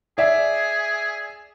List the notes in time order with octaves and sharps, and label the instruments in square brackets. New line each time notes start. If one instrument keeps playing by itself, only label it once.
[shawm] G#4 [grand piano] D5 E5